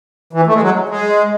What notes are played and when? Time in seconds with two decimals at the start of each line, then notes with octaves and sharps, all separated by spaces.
0.33 E3
0.47 A3
0.54 G#3
0.62 F#3
0.89 G#3